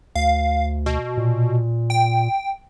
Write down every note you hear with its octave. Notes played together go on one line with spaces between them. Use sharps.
D2 F5
B2
A#2
G5